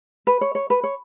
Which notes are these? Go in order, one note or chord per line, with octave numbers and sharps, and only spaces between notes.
B4
C#5
C#5
B4
C#5